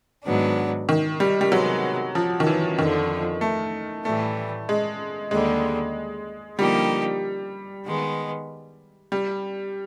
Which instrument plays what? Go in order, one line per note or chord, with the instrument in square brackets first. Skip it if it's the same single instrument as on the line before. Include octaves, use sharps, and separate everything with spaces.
[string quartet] G#2 D#3 F#3 B3 D4
[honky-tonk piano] D#3
G3
G3
[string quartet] C3 D#3 G#3 B3 [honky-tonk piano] F#3
[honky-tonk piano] F3
D#3
E3
[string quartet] F2 D3 F3 [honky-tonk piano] D#3
[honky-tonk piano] A3
[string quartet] A2 E3 G3 [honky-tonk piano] A3
[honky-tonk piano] G#3
[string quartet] D#2 D3 G3 [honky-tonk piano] G#3
[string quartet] D3 F3 A#3 D#4 G4 [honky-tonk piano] G3
[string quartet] D#3 G#3 B3
[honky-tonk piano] G3